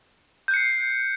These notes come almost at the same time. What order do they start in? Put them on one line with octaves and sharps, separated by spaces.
G6 F#6 C#7 C7